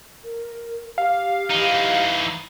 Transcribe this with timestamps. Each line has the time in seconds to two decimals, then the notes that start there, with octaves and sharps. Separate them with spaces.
0.24 A#4
0.98 G4 F5
1.50 E3 D#4